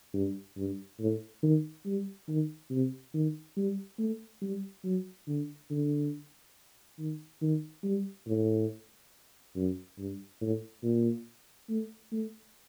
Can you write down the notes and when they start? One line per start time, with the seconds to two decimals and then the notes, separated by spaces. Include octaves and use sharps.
0.14 G2
0.57 G2
1.00 A2
1.43 D#3
1.86 G3
2.28 D#3
2.71 C3
3.14 D#3
3.57 G3
3.99 A3
4.42 G3
4.85 F#3
5.28 D3
5.70 D3
6.99 D#3
7.42 D#3
7.84 G3
8.27 A2
9.56 F#2
9.98 G2
10.41 A2
10.83 A#2
11.70 A3
12.13 A3